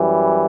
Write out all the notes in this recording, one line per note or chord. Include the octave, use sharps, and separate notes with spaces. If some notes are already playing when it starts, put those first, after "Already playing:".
Already playing: F#2 E3 G3